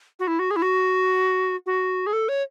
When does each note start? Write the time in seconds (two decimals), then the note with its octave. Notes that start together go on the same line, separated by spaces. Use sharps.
0.19 F#4
0.27 E4
0.39 F#4
0.51 G#4
0.56 E4
0.62 F#4
1.66 F#4
2.06 G#4
2.13 A4
2.29 C#5